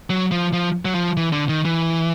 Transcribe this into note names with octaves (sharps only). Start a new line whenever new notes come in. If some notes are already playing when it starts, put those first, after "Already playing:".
F#3
F3
F3
F#3
F3
E3
D3
D#3
E3